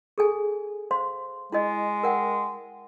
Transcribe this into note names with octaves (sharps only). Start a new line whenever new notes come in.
G#4 A4 G#5
C5 F5 C6
G#3 E4 F#4 D#5
A#4 F#5 G5